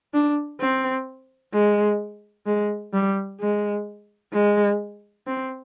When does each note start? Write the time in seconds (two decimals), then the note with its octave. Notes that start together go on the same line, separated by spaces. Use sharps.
0.13 D4
0.60 C4
1.54 G#3
2.46 G#3
2.93 G3
3.41 G#3
4.33 G#3
5.27 C4